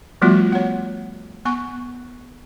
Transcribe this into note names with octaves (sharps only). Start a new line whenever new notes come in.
F3 G3 A3 B3 F4 F#4
C#5 F#5
B3 G#5 C#6